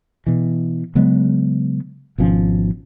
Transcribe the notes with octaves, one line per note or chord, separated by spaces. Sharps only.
B2 E3
C#3 F#3 G#3 B3
G#1 B2 F3 C#4